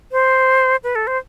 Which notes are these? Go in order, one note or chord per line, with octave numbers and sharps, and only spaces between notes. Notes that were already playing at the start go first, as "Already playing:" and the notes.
C5
B4
A4
C5